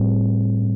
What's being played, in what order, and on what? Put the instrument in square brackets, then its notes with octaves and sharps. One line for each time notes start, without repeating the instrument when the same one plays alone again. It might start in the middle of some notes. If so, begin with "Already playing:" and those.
Already playing: [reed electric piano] A2 G3 C4